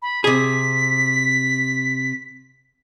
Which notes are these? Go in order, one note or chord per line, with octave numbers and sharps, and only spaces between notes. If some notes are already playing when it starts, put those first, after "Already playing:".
B5
C3 G#4 B6